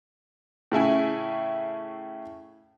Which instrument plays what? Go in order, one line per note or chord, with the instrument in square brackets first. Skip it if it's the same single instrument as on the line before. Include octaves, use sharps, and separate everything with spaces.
[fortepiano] A2 C#3 E4 G#5